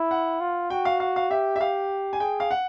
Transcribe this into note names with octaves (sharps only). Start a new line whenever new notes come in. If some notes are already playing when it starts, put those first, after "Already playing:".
Already playing: E4
F#5
F4
F#4 G5
F5
F5
F5
G4 E5
E5
G4 F5
G#5
G#4 G5
F5
F#5